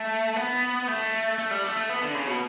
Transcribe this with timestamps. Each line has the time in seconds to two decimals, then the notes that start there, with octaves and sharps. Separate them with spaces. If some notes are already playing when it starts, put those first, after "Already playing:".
Already playing: A3
0.36 B3
0.88 A3
1.38 A3
1.51 G3
1.63 A3
1.77 A3
1.89 B3
2.02 D3
2.15 C#3
2.27 B2